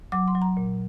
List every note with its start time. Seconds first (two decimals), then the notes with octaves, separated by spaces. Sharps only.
0.12 F#3 D6
0.28 C6
0.35 F#3
0.42 A#5
0.57 A#2